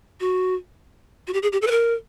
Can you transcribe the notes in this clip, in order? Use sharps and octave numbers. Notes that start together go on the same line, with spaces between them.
F#4
F#4
G4
G#4
G4
A4
B4
A#4